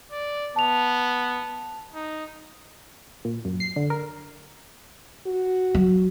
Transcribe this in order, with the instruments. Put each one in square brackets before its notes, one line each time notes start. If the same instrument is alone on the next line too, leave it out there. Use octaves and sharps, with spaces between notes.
[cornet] D5
[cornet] B3 [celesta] A5 F7
[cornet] D#4
[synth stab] A#2
F#2
C7
D3
A#4
[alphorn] F#4
[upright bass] F#3